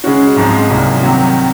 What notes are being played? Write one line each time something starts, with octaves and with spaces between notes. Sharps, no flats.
C#3 G#3 C#4 F#4
G#2 F3 G#3 C4 D#4
C2 A#2 F#3
C3 D#3 F#3